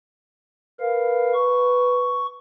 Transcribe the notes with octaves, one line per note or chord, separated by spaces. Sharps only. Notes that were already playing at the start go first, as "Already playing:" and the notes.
A#4 B4 F5
C#6